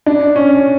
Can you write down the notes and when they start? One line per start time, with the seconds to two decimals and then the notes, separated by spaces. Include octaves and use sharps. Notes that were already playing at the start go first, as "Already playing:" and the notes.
0.06 D4
0.36 C#4